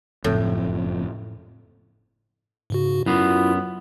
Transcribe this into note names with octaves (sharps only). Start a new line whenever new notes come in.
F#1 F2 A2
G#2 C#3 F#4
F#2 B3 E4 F4